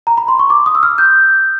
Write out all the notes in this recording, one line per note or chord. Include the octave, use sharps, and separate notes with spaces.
A#5
B5
C6
C#6
D6
D#6
E6
F6
G6